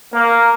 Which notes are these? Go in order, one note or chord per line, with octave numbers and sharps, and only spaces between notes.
A#3